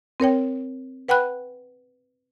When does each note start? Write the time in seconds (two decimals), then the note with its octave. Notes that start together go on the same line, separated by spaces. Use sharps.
0.20 C4 A#4 C#5 G5
1.08 B4 F#5 G5 B5 F#6